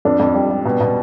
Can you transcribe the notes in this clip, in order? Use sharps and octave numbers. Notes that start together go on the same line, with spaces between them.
F2 D4
F2
G3
G3
B2
B2